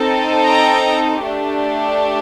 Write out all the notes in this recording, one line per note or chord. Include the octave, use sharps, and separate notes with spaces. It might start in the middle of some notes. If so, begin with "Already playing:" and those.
Already playing: C4 D#4 A4
G5 A#5
A3 D4 G4